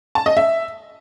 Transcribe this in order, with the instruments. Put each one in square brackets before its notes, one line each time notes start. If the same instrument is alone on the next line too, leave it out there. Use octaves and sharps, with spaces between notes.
[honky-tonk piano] A5
D#5
E5